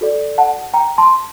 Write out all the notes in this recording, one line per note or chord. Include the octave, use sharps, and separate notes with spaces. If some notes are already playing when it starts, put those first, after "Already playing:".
F#4 A4 D5
F#5 A5
G5 A#5
A5 C6